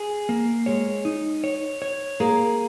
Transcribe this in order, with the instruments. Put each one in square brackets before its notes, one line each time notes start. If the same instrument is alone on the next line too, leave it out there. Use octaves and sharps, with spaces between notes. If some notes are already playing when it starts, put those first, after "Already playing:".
Already playing: [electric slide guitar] G#4
A#3
[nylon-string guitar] G#3 [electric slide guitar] C#5
[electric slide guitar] D#4
C#5
C#5
[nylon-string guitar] A#3 [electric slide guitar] G#4